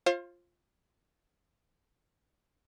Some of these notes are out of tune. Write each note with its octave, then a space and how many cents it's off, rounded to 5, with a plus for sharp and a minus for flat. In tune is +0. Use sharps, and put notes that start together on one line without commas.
F4 +0 C5 +35 F5 -10